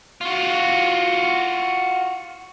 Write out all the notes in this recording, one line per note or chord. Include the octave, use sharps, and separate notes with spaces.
F4 F#4